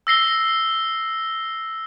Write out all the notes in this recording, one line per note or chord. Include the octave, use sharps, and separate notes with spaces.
E6 A#6 C7 G7